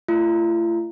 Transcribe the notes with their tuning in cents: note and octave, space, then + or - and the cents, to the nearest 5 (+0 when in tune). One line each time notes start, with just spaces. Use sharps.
A3 +15 F4 -45